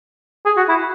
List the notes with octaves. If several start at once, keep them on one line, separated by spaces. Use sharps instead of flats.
G#4
F#4
E4